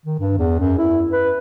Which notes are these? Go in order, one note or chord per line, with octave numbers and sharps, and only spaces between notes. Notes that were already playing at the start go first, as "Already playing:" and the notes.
D#3
G2
E2
F#2
E4
B4